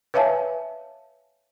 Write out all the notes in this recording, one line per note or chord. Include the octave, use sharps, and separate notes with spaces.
B4 C#5 E5 F5 G#5 A5